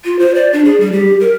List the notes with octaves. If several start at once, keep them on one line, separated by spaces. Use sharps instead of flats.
F4
C5
D5
D4
G#4
G3
G4
A#4